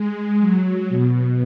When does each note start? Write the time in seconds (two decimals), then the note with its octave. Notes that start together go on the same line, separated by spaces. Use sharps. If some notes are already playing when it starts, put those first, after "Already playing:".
Already playing: G#3
0.40 F#3
0.89 B2